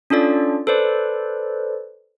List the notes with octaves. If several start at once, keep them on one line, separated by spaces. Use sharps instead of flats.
C#4 D4 F4 A4 D5
A4 B4 C5 D5